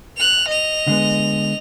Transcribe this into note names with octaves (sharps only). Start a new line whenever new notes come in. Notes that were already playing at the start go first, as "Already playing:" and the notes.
F#6 F7
D#5 F7
D3 G#3 B3